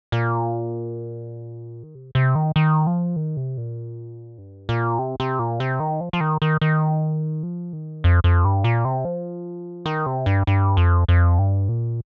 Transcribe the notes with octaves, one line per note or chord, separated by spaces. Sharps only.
A#2
D#3
C3
C3
D#3
D#3
F3
D#3
C3
A#2
G2
A#2
C3
C3
A#2
C3
D#3
F3
F3
D#3
D#3
D#3
F3
D#3
F2
F2
G2
A#2
C3
F3
D#3
C3
G2
G2
F2
F2
G2
A#2